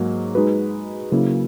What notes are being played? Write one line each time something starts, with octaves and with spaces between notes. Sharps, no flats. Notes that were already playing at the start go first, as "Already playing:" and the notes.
Already playing: G#2 F#3 A#3
G#3 D#4 F#4 B4
C#3 F#3 A#3 E4